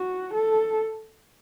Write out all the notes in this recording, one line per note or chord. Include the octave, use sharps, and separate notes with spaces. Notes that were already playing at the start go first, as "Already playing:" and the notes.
Already playing: F#4
A4